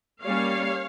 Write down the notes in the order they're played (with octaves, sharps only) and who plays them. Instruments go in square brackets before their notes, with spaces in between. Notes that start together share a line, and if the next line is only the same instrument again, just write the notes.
[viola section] G3 A#3 C#4 C#5 F5